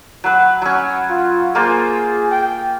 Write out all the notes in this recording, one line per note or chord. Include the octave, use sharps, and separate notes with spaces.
F#3 B4
F#3 C#4
F4
A#3 F4 G#4 C5
G5